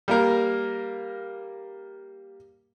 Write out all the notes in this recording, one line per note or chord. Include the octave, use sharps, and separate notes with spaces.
G3 A#3 A#4